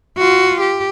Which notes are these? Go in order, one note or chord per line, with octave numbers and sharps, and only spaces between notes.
F4 F#4
G4